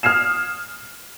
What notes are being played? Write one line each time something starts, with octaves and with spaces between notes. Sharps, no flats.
D#6 F6 G#6 C7 E7